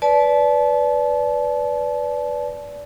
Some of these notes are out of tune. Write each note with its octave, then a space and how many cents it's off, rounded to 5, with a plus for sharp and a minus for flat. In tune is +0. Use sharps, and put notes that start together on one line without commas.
B4 +0 D5 -20 A5 -30